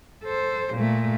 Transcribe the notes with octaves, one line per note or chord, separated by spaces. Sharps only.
A4 C5
A#2 A3